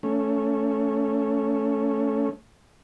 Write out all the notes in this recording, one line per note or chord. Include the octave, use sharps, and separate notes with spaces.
A3 C#4